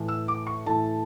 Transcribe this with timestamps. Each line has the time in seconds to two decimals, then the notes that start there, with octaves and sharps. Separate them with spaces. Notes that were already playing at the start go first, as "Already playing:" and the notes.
Already playing: A2 E3 A3 E4
0.08 E6
0.28 D6
0.47 C#6
0.66 A2 E3 A3 E4 A5